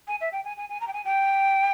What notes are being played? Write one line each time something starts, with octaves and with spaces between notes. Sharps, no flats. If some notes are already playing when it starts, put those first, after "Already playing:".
G#5
E5
G5
G#5
G#5
G#5
A#5
G5
G#5
G5